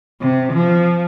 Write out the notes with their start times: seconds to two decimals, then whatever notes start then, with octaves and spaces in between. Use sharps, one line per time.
0.21 C3
0.53 F3